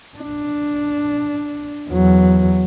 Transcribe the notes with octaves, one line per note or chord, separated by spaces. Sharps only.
D4
E2 F#3